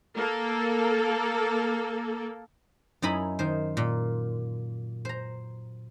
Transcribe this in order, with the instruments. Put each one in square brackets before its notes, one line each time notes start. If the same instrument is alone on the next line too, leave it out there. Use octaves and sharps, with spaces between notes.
[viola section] A#3 A4
[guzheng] F#2 D#4 E4 G#5 B5
D#3 C5
A#2
C5 A#5